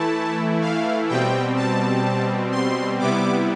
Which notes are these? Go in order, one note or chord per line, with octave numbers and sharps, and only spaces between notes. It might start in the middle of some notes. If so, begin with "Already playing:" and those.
Already playing: E3 A3 E4 A5
F5
B2 G3 C4 G5
A5
C6
C3 G3 B3 E4 D6